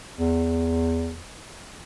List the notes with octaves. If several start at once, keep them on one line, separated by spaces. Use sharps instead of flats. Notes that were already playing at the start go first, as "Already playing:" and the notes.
E2